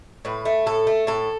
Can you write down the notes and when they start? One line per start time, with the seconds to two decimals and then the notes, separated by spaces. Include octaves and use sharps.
0.25 A2 B4
0.45 A3
0.66 A2 A4
0.87 A3
1.07 A2 A4